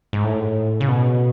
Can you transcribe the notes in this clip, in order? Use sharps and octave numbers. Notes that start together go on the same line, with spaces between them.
G#2
A2
C#3
B2